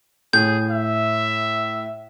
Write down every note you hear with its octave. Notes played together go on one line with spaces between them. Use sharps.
A2 G#4 G6
E5